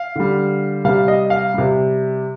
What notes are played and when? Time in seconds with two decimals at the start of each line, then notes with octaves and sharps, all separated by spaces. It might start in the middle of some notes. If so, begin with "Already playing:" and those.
Already playing: F5
0.16 D3 G3
0.84 C3 G3 F5
1.08 D#5
1.30 F5
1.54 C3 G3